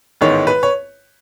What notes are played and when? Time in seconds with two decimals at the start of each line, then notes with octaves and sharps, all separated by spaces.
0.21 A1 G#2 D#3 G#3 B3 C#5
0.47 B4
0.63 C#5